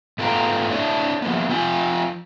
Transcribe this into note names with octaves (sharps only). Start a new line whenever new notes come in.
G#2 A3 B3 F4 G5 A#5
D4 E4 C#5
F3 A#3 B3
F3 F4 G5 G#5